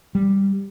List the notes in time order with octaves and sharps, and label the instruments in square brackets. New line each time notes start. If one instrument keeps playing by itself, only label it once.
[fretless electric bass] G3